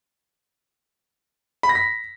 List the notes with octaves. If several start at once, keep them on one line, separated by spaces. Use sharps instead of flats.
B5
A#6
B6